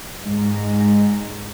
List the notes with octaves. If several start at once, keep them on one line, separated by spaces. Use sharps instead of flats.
G#2